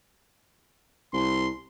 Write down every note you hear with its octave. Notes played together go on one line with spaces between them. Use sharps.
C2 C6